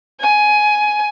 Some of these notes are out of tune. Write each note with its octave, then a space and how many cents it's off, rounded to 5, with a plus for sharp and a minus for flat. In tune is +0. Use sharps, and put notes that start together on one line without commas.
G#5 +15